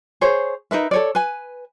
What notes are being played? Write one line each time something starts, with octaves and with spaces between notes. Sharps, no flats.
G#4 C5 C#5
D#4 A#4 B4 E5
A4 C#5 D5
B4 G#5